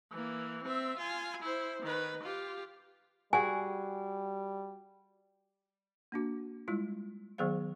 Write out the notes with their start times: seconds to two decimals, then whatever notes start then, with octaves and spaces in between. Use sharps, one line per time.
0.12 E3 A#3
0.63 C4 E5
0.97 F4 G#5
1.42 E4 C5
1.83 D#3 B4
2.23 F4 G4
3.33 G3 F#4 G#4 G#5
6.12 A#3 D4 F#4
6.68 G3 G#3 E4 F4
7.38 D#3 F#3 B3 G#4 C5 F5